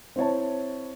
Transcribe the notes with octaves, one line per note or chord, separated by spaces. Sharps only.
C4 E4 C#5 A5